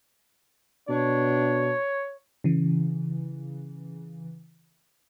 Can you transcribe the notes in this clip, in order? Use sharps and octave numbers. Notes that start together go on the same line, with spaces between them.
B2 D4 C#5
C#3 E3